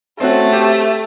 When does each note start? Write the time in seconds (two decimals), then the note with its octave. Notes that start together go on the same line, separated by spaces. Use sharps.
0.20 A3 C4 C#4 F#4
0.52 G4